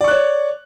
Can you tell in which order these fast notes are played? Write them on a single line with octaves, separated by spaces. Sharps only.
D5 C#6 F#6 C#5